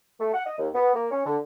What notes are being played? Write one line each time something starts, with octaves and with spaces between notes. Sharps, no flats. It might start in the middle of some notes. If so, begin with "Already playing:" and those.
A3
F#5
D#5
D#2
B3
A#3
C#4
D3